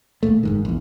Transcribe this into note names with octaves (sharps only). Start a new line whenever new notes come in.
D#1 D#2 A#2 A3
F#1 G#2 D#3
A#1 E2